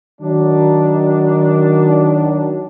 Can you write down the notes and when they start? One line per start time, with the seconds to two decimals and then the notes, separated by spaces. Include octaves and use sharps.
0.21 D#3 F#3 D4